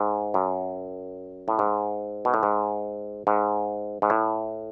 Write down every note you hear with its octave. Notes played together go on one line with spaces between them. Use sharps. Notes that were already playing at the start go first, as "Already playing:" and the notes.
Already playing: G#2
F#2
A2
G#2
B2
A2
G#2
G#2
G#2
A2